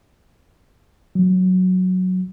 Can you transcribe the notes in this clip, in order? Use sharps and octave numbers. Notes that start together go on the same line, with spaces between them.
F#3